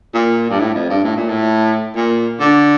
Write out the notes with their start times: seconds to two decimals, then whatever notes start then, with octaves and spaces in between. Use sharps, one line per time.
0.14 A#2
0.50 G2
0.59 A2
0.75 F2
0.89 G2
1.04 A2
1.16 A#2
1.29 A2
1.95 A#2
2.40 D3